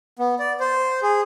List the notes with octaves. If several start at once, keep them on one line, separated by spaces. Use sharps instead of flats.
B3
D5
C5
G#4